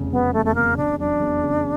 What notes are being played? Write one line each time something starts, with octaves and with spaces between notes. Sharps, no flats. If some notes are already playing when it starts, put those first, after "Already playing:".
Already playing: F1 E2 C#3
F#3 B3
E2 A3
A3
C#3 A#3
F1 D4
F#3 D4
E2
C#3